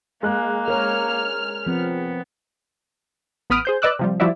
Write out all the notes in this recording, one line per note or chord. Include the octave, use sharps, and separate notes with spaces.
G#3 A#3 F#6
A#4 C#5 F6
F3 B3 C4
A1 B3 B5 D#6 F6 D7
G#4 C5 G6
B4 D5 D#5 D6 E6 F#6
C3 F3 G3
F3 G3 E4 F#4 D5 E5